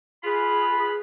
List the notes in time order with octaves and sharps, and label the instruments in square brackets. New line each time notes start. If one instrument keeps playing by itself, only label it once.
[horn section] F4 B4 B5 [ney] G#4